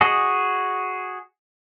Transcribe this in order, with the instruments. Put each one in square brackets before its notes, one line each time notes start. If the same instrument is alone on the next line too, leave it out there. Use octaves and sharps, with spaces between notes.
[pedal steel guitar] F#4 G#4 D#5